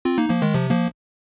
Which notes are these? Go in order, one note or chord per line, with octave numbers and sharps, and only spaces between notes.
C4 F4
A#3 D#4
F3 A#3
D#3 G#3
C3 F3
F3 A#3